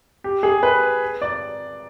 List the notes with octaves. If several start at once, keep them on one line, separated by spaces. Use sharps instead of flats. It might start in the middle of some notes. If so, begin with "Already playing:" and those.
G4
G#4
B4
D5